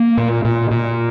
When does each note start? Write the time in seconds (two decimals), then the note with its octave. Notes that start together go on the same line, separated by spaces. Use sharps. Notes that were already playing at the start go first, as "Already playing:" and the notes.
Already playing: A#3
0.17 A#2
0.45 A#2
0.71 A#2